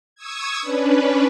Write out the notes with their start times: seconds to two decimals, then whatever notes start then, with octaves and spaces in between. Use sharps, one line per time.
0.15 C#6 D#6 E6 G#6
0.60 C#4 D4 B4